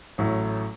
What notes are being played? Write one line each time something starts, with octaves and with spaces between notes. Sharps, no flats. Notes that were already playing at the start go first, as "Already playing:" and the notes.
A1 A2 F#3